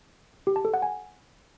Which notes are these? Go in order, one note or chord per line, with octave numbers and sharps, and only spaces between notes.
G4
A5
A4
F#5
G#5